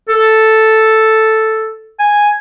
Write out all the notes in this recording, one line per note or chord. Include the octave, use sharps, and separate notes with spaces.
A4
G#5